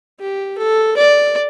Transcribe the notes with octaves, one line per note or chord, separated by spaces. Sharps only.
G4
A4
D5